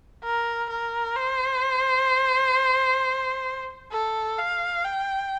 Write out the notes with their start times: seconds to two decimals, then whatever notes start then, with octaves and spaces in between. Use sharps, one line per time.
0.24 A#4
0.70 A#4
1.16 C5
3.92 A4
4.38 F5
4.85 G5